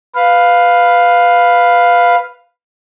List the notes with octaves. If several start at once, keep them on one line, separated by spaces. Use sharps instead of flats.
B4 F5